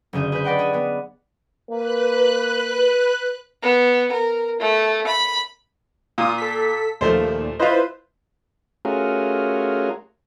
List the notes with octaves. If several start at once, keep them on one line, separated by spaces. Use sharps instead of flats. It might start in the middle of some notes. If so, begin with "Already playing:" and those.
F#1 D3 G#4 G6
G#4 B4 C5 G6
B4 D5 D#5 F#5 G5 B5
G#4
B3 G#4
A#3 B4 F#6
B3
A#4
A3
B5
A#2 F4 D#6
A4 B6
D#2 A#2 F3 A3 C5
E4 F4 B4 C5 D#5
A3 C#4 F4 F#4 G#4 A#4